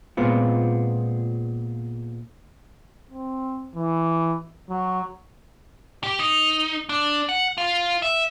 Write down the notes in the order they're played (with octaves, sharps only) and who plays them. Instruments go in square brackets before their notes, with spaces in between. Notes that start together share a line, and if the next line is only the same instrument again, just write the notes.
[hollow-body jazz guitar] A#2 G#3 B3 C4 F4
[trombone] C4
E3
F#3
[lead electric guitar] G4
D#4
D4
F#5
F4
E5